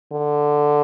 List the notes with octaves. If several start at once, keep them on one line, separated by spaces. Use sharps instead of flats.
D3